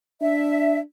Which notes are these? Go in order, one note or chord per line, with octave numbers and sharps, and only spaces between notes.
D4 E5